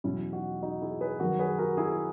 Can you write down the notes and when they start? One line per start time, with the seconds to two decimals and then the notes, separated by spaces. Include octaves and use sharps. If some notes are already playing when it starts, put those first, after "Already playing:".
0.04 E2 B2 F#3 C#4 E4
0.33 D#4 F#4
0.63 D#4 F#4
0.81 E4 G#4
1.01 G#4 B4
1.20 F#2 D#3 F#3 F#4 A#4
1.39 G#4 B4
1.58 F#4 A#4
1.77 E4 G#4